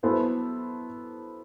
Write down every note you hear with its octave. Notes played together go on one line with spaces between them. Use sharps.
F#3 B3 E4 A4 C5